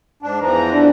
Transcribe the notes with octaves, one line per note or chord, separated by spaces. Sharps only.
G#2 D4
E2 E3 F3 A#5
D4